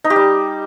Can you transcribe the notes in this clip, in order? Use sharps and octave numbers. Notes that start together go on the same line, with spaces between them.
D#4
G4
G3